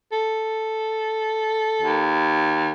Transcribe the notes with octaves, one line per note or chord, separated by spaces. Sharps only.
A4
D#2